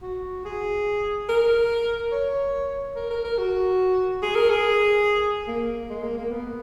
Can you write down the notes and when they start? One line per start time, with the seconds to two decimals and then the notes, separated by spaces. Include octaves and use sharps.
0.02 F#4
0.45 G#4
1.29 A#4
2.12 C#5
2.96 A#4
3.10 A#4
3.24 A#4
3.38 F#4
4.22 G#4
4.35 A#4
4.50 G#4
5.48 A#3
5.90 G#3
6.03 A#3
6.18 A#3
6.31 B3